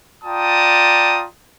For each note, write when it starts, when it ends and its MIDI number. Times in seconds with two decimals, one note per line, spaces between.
0.24 1.26 65
0.24 1.26 74
0.24 1.26 79
0.24 1.26 81
0.24 1.26 82
0.24 1.26 87